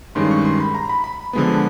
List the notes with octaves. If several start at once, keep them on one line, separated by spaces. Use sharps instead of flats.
G2 D#3 G#3 C#4 C6
C#6
C6
B5
A#5
B5
B5
D3 F3 G#3 B3